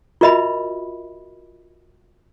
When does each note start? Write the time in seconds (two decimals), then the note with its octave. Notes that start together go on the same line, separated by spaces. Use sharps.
0.21 F4 F#4 A#4 D#5 E5 B5